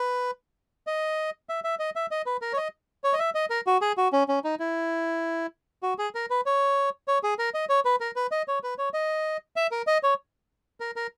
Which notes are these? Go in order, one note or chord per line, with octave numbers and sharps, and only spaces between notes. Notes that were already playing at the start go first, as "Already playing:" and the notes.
Already playing: B4
D#5
E5
E5
D#5
E5
D#5
B4
A#4
C#5
D#5
C#5
D#5
E5
D#5
A#4
F#4
G#4
F#4
C#4
C#4
D#4
E4
F#4
G#4
A#4
B4
C#5
C#5
G#4
A#4
D#5
C#5
B4
A#4
B4
D#5
C#5
B4
C#5
D#5
E5
A#4
D#5
C#5
A#4
A#4